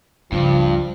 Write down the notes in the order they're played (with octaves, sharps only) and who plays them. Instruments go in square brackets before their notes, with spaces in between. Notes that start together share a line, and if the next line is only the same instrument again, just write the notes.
[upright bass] C#2 C#3 [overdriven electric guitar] G2 [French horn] F3